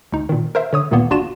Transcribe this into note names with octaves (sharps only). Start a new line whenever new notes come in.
D2 D#4
A#2 D#3
A#4 C5 E5
D3 C#5 D#6
D2 A#2 D#3 A#3 B3
G1 D4 F4 F#4 E7